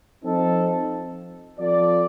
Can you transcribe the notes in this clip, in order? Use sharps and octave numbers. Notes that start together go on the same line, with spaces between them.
F3 C4 D#4 A4
F3 C4 F4 A4 D5